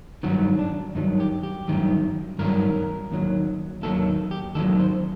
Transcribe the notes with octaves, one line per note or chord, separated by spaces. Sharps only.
G2 D#3 F#3 F#4
D4
G2 D#3 F#3 D#4
G4
G4
G2 D#3 F#3
G2 D#3 F#3 A#4
D#2 D#3 F#3
D#2 D#3 F#3 A4
G4
D#2 D#3 F#3 A4
C5